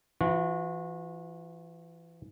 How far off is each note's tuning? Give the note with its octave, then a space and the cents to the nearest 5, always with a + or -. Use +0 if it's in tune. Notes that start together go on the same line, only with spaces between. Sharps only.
E3 +30 F#4 -30